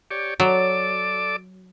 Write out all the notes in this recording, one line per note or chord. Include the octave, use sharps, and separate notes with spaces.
G4 C#5 D5
F#3 A4 D5 D6